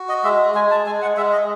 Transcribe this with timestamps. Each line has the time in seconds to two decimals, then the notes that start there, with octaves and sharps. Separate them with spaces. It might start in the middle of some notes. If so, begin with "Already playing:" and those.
Already playing: F#4
0.09 D#5
0.24 G#3 E5
0.55 G#3 G#5
0.71 A5
0.86 G#3 G#5
1.02 F#5
1.17 G#3 E5
1.32 D#5